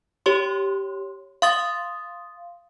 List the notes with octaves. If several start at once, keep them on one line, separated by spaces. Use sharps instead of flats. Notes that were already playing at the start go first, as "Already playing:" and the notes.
G4 C#5 C6
F5 C6 D#6 A6